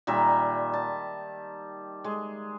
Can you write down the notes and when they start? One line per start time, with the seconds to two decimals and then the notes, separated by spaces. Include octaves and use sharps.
0.07 A#2 D#3 G3 E5
0.73 A5
2.04 G#3